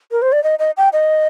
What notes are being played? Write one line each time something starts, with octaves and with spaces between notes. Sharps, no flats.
A#4
C5
D5
D#5
D#5
G5
D#5